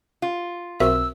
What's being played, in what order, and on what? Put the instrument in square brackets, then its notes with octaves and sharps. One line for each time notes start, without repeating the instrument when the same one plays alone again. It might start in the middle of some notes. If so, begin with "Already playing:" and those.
[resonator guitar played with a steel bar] F4
[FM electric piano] B1 C4 [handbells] F#4 A#4 E5 [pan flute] E6